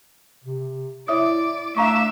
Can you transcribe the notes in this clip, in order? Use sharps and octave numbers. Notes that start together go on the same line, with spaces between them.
C3
E4 C#5 D5 E5 D#6
A3 D4 E5 F5 A#5 C#6